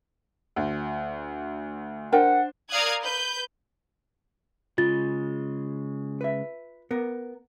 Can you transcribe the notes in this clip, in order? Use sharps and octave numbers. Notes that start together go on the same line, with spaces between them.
D2
D4 A#4 C5 F#5 G5
A#4 D5 F5 D#6 F#6 G#6
B4 G6
C#3 G#3 F4 A6
B4 E5
B3 A#4